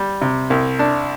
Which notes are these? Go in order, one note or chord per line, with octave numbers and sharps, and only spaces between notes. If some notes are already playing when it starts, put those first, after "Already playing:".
Already playing: G3
C3
C2
D4